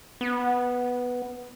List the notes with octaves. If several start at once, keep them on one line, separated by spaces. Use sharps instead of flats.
B3